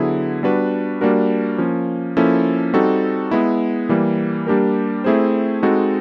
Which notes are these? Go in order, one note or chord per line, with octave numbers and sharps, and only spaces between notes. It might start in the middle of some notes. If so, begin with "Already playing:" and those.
Already playing: D3 F#3 B3 E4 G#4
G3 B3 D4 F#4 B4
G3 A#3 D4 F#4 A#4
F3 A#3 C#4
F3 A#3 C#4 E4 A4
G3 C4 D#4 F#4 A4
G#3 B3 E4
E3 G3 A#3
G3 A#3 D4 G4 A#4
A3 C4 E4 G#4 C5
G#3 C4 D#4 F#4 A4